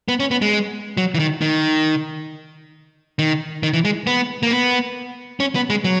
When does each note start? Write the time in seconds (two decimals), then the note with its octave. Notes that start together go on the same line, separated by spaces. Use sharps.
0.08 B3
0.20 C#4
0.31 B3
0.42 G#3
0.97 F#3
1.14 E3
1.19 D#3
1.41 D#3
3.19 D#3
3.63 D#3
3.73 E3
3.85 G#3
4.07 B3
4.43 A#3
4.51 B3
5.40 C#4
5.55 B3
5.70 G#3
5.84 F#3